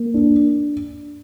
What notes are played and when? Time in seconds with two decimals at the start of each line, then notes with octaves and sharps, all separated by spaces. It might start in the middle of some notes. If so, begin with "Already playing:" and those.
Already playing: A#3
0.14 D4